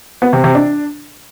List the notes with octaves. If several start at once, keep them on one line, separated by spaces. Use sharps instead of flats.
B3
C3
C3
D4